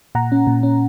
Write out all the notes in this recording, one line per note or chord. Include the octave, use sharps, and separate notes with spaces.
A#2 F#5 A#5
C#4
A#2
C#4